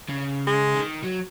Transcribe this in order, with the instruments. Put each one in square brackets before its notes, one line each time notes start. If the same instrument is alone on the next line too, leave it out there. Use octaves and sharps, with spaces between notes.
[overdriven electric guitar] C#3
[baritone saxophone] G#3
[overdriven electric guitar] D#3
F#3